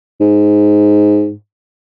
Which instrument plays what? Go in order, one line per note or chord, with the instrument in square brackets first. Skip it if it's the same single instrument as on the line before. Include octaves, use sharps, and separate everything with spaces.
[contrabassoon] G#2